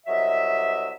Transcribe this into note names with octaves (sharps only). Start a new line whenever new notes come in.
C2 F#3 D#5 E5